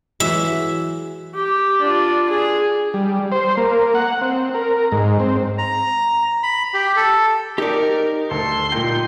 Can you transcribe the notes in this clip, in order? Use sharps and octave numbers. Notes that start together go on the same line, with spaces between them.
E3 F#3 G#3 E5
G4
D4 F4
G#4
G3
C5
A#3
F#5
C4
A#4
G#2
C4
A#5
B5
G4
A4
D#4 G4 A#4 D5
D2 A4 C6
A#2 A#3 D#4 F4 G5